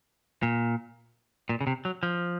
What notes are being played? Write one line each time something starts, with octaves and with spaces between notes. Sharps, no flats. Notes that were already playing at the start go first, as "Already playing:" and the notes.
A#2
A#2
C#3
C3
F#3
F3